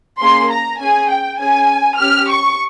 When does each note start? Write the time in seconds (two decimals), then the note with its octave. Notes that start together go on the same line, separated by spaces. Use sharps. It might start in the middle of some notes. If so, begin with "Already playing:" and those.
0.20 A#3 C#4 G#4 C6
0.50 A#5
0.80 C#4 G#4 G#5
1.10 G5
1.40 C#4 G#4 G#5
1.99 C#4 G4 F6
2.29 C#6